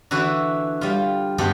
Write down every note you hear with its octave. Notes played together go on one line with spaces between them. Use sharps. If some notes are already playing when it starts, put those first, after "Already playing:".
D3 E3 E4 F#4 B4
G3 F4
G2 G#3 B3 G4 A4 G5